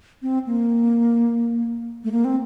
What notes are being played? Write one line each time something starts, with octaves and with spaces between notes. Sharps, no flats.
C4
A#3
A3
A#3
C4